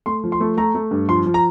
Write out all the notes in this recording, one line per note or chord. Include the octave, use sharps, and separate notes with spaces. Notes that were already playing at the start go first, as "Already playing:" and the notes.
A3 C6
F3
C6
A3
A3 A#5
A3
G2
F3 C6
F3
A#5